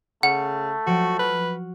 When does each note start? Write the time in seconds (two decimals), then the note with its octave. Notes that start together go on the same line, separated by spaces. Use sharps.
0.23 C#3 A3 F#5
0.87 F3 F#3 F#4 G5
1.19 F#4 B4 F6